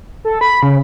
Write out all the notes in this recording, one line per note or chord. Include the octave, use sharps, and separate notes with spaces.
A4
B5
C#3